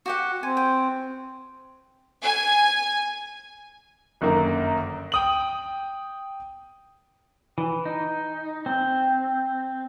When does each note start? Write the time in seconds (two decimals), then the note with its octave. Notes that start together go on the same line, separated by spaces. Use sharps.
0.06 F#4 G4 F#5
0.43 C4 G#5
0.57 G5
2.23 G#5
4.21 G1 F#2 D#3 A#3
5.12 G5 D#6 F#7
7.58 E3
7.85 D#4
8.66 C4